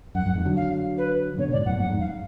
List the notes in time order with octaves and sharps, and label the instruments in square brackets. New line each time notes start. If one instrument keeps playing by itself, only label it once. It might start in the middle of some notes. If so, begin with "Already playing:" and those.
[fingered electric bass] F#2 [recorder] F#5
[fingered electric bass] F#2
F2 G#2
D3 F#3
[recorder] F5
B4
[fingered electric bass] B2 D3 [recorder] C#5
[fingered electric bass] G#2 B2 [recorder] D5
[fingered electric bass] F#2 A2 [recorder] F#5
[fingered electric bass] F#2 A2 [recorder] F#5
[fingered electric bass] F2 G#2
[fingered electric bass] F#2 [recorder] F5